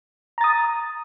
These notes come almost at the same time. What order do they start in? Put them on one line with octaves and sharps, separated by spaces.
A#5 A6 D#6